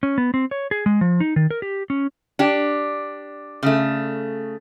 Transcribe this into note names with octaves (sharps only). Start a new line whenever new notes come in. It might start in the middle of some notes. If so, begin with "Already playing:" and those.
C#4
B3
C4
C#5
G#4
G#3
F3
D#4
D#3
A#4
G4
C#4
D4 G4
C#3 A3